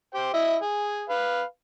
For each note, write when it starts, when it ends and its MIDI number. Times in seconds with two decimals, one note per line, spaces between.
0.15 0.31 67
0.15 0.31 72
0.15 0.31 79
0.34 0.56 64
0.34 0.56 75
0.34 0.56 76
0.62 1.04 68
1.09 1.42 71
1.09 1.42 77